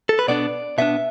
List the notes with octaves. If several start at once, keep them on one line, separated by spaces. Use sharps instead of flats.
A4
B4
B2 B3 D4 D5
B2 B3 D4 E5